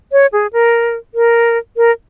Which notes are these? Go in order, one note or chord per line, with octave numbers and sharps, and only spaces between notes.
C#5
G#4
A#4
A#4
A#4